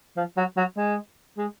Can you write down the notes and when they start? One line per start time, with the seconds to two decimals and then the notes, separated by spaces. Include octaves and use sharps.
0.17 F3
0.37 F#3
0.57 F#3
0.77 G#3
1.37 G#3